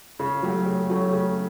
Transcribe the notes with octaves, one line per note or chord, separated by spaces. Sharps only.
C#3
F#3 A3 C#4 G4
C#3
F#3 A3 C#4 G4
C#3